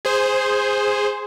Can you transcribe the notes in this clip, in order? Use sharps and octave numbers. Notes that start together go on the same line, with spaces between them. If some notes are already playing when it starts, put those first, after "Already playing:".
G#4 C5